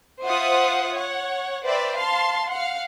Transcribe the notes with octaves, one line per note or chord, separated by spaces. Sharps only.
F4 C5 E5 F#5 D#6
C#5 F#5
B4 C5 D5 E5 G5
F5 A5 C6
F5 F#5